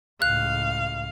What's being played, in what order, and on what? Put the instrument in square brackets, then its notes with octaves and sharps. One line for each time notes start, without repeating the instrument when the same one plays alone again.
[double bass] C#2 A2 [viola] F5 [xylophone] F#6